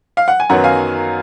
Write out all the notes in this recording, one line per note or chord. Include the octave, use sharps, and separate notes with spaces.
F5
F#5
G#5
F#2 D#3 F#3 B3 F#5 A#5
F5 G#5